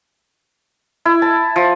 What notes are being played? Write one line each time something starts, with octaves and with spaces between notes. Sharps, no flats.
E4
A5
F3